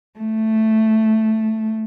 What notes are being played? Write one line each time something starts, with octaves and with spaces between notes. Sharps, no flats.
A3